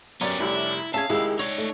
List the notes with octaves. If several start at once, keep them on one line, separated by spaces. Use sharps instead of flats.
F#2 B3 C#4 D4 G4 A6
F1 C2 C3 E4
C#4 G#4 E5 F5 G#5 A5
C#2 D#3 E4 G4 G#4 E6
D#4 C#5 D5
A3